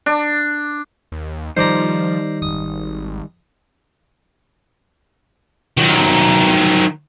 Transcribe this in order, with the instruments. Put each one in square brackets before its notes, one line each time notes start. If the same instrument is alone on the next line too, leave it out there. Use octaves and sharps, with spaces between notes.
[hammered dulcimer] D4
[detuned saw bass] D#2
[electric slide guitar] D#3 G3 D#4 [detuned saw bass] F3 [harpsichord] C5 D5 A#5
[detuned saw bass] G#1 [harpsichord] D#6
[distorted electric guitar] D#3 F#3